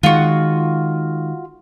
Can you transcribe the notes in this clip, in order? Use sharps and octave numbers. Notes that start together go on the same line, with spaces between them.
D#3 G#3 F4 F#4